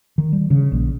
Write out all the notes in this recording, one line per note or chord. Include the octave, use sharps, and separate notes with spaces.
D#3
G3
C#3
A#1